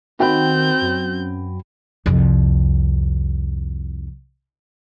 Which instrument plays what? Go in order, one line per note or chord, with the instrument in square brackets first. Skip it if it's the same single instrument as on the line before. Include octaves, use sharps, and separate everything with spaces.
[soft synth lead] D#3 [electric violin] C4 G6 [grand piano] F#4 G5 B5
[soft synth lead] F#2
[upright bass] C2 F2